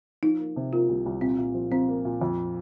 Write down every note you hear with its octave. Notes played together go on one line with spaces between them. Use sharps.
F3 D#4
A#3
C3
A#3 F4
C2
C2
A#2 C4
A#2
F3
F3 C4
A#3
A#2
F2